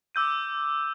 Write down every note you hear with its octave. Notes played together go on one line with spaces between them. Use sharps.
D6 E6 G6 D#7